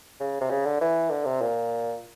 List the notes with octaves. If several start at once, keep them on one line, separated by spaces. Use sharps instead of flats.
C#3
C3
C#3
D3
E3
D3
C3
A#2